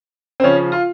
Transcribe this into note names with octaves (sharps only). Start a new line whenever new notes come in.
C4
C#3 F3 C#4
F4